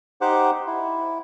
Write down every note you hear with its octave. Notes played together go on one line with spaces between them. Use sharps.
D#4 G4 C5 F#5 D6
E4